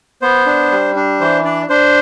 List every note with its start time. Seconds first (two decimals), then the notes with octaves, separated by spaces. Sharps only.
0.22 B3 C5
0.46 D4
0.71 G3
0.96 D4
1.20 E3 C5
1.45 D4 D5
1.69 D4 C5